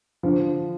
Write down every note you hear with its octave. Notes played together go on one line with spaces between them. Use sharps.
D3 F3